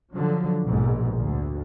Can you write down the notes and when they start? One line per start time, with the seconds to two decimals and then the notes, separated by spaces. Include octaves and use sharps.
0.13 D3 F3 F#3
0.66 A#1 G#2 B2
1.18 D2